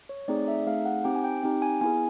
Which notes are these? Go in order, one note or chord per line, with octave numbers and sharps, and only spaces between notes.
C#5
A3 C4 D#4 G#4 D5
E5
A3 C4 D#4 G#4 F5
F#5
C4 D#4 G4 G5
G#5
G5
C4 D#4 G4 G5
G#5
B3 E4 G#4 G#5